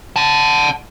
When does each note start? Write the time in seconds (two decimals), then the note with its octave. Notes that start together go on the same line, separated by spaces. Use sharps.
0.16 F#5 A5